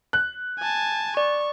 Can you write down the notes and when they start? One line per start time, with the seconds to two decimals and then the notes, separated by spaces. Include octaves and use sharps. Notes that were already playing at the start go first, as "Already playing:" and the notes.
0.13 F#6
0.59 G#5 A5
1.17 D5 C#6